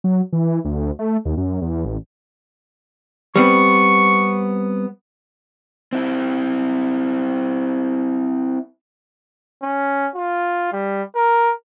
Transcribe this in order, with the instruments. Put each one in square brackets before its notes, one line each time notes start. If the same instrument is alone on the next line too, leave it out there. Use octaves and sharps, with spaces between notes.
[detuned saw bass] F#3
E3
D2
A3
D#2
F#2
E2
A1
[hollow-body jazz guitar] G3 B3 C4 [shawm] C#6
[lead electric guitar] C4 E4
[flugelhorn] C#4
F4
G3
A#4